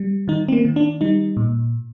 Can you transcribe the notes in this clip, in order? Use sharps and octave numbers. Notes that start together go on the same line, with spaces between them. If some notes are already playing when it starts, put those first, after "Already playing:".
Already playing: G3
D#3 D#4
C4
A#3
D#3
D4
G3 D#4
A#2